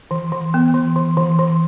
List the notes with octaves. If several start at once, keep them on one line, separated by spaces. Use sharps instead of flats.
E3
E3
B3
E3
E3
E3
E3